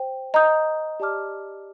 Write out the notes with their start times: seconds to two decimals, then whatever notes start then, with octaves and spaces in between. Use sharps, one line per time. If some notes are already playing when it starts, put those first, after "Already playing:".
Already playing: C5 G5
0.34 D#5 A#5 D#6 G6
1.00 G4 D5 A5 D6 F6